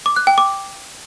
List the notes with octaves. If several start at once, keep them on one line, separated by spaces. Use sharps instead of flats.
D6
F#6
G5
D6